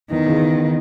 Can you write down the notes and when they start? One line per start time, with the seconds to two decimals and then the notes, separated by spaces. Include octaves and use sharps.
0.10 E2 D#3
0.26 C#3 E3